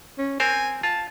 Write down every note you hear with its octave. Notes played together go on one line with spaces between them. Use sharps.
C#4
C4 A#4 C5 G#5
F4 A5